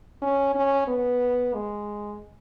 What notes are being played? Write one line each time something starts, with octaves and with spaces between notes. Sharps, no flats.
C#4
C#4
B3
G#3